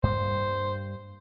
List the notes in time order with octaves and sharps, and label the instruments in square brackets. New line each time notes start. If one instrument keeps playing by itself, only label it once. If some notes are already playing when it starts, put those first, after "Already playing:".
[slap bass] G2 G3 A#3 [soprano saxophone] C5